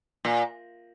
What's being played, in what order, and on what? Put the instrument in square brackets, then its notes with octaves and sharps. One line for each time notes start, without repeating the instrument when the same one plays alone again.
[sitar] A#2